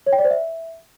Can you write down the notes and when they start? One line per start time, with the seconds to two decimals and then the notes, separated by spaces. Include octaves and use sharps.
0.06 C#5
0.13 G5
0.19 D5
0.25 C5
0.31 E5